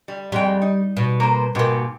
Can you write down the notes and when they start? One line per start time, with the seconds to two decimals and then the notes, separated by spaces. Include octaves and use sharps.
0.08 G3
0.32 F2 G3 G#3 G5
0.62 D#4
0.97 B2
1.20 A#3 C5
1.55 G#2 B2 A#3 G4